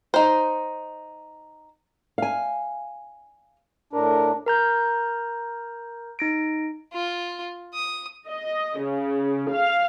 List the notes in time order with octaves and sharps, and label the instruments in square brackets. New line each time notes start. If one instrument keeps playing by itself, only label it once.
[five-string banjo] D#4 C5
[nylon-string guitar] F5 G#5
[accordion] A2 D4 [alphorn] A#4
[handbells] A#4 A#5 G6
D#4 A#6 D7
[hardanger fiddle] F4
D#6
[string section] D#5
C#3
F5